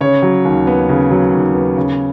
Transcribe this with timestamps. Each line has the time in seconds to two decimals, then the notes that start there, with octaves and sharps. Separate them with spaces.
0.01 C#3 C#5
0.23 F#3
0.45 D#2
0.67 B3
0.89 C#3
1.11 F#3
1.33 D#2
1.55 B3
1.77 C#3